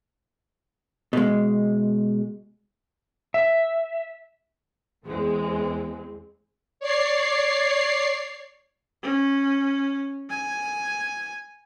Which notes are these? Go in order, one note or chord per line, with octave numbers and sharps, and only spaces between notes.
B2 G#3
E5
E2 E3 G#3 C4
C#5 D5 C7
C#4
G#5